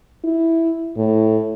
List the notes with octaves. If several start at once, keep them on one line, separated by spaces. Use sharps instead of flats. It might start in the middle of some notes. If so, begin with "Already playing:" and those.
E4
A2